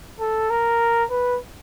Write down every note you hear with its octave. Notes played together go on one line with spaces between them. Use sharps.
A4
A#4
B4